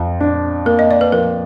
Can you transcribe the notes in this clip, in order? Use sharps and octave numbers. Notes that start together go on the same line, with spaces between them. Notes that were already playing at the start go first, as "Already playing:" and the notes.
Already playing: F2
D4
A#3 A#4
D#5
D5
B4
F3 A#4